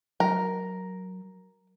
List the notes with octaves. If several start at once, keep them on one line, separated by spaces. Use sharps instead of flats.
F#3 A#4